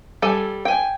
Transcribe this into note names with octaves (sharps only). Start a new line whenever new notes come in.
G3 A4 G#5
G5 G#5